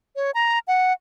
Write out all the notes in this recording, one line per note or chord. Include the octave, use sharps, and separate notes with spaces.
C#5
A#5
F#5